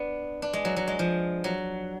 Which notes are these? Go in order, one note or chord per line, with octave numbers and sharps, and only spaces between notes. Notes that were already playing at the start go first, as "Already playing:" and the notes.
Already playing: B3 D4
D4
G#3
F#3
F#3
G#3
F3
F#3